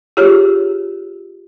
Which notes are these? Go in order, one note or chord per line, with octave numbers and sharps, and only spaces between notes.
F4 G4 G#4 C#5 F6